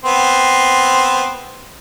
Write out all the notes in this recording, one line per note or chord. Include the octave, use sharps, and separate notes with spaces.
B3 C4 C6